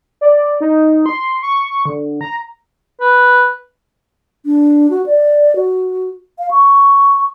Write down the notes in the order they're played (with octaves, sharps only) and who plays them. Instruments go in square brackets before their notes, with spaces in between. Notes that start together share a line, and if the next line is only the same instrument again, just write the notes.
[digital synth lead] D5
D#4
C6
C#6
D3
A#5
[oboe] B4
[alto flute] D4
F#4
D5
F#4
F5
C#6